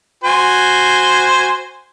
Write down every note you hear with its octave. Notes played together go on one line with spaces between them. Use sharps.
F#4 C5 G#5